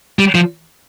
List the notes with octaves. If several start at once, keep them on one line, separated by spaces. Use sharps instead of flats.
G3
F3